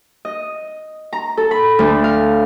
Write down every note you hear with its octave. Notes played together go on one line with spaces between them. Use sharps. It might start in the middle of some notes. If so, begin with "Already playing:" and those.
D#5
A#5
A4
B5
D2
F5